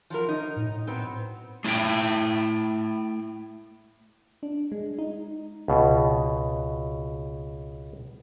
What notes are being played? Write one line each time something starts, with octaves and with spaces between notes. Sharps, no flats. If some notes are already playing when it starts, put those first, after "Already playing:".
F3 F#3 A#4
D#4
A2
F#3 B3 C4
A3 E4 E5 G5
D4
G#3
D#4
C#2 B2